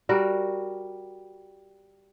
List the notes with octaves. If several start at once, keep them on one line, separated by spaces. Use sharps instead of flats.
G3 F#4 A#4